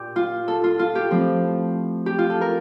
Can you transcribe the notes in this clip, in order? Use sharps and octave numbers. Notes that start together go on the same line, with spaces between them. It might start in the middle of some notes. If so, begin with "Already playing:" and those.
Already playing: A#2 D4 G4
F4
A4
F4
F4
G4
A2 F3 C4
G4
F4
A4
A#4